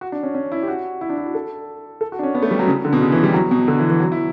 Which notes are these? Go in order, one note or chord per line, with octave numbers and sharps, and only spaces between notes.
F#4
D4
C#4
C#4
E4
G4
F#4
E4
D4
E4
F#4
A4
A4
F#4
D4
C#4
B3
A3
G3
F#3
C#3
D3
B2
C#3
E3
G3
F#3
B2
D3
E3
E3
F#3
E4